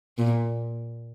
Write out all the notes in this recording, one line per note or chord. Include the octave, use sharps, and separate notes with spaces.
A#2